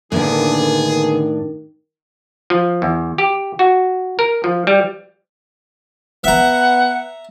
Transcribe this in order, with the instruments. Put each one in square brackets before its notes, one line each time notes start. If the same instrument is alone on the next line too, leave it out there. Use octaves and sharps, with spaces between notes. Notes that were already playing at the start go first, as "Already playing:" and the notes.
[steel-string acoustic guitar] A2 D4 [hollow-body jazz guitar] D3 A#3 B3 [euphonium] D#3 [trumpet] G#4
[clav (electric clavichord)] F3
E2
G4
F#4
A#4
F3
G3
[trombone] B3 [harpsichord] E5 A#5 [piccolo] F#5